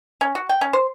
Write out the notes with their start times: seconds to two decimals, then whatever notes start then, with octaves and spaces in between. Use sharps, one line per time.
0.21 C#4
0.35 F#4
0.49 G5
0.61 C#4
0.73 C5